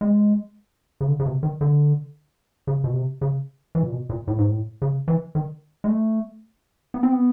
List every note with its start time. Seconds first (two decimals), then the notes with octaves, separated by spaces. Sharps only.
0.01 G#3
1.01 C#3
1.08 D3
1.20 C#3
1.26 C3
1.43 D#3
1.61 D3
2.67 C#3
2.84 B2
2.94 C3
3.21 C#3
3.75 E3
3.83 A#2
3.92 B2
4.09 A#2
4.27 A2
4.38 G#2
4.50 A2
4.82 C#3
5.08 E3
5.35 D#3
5.84 G#3
5.87 A3
6.94 B3
7.03 C4
7.12 B3